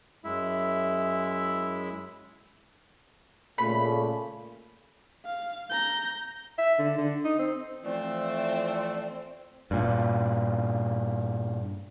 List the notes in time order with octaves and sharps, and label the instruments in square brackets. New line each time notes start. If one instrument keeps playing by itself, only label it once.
[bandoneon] F#2 G#3 E4 E5
[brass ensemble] A#2 C#3 A3 [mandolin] B5
[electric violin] F5
A#5 G6
[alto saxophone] E5
D3
D3
D#4
C4
[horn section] E3 F3 A3 [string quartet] C4 C5 [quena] D5
[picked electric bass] G2 A#2